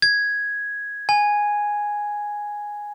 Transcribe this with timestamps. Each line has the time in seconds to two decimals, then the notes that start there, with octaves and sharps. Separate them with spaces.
0.02 G#6
1.09 G#5